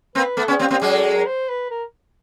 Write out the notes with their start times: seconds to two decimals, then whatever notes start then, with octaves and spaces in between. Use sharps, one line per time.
0.15 A#3 C4 B4
0.37 A3 B3 A4
0.48 B3 C#4 G#4
0.59 A#3 C4 G4
0.70 A#3 C4 G4
0.81 F#3 G#3 G#4
0.93 A4
1.04 A4
1.15 A#4
1.26 C5
1.49 B4
1.70 A#4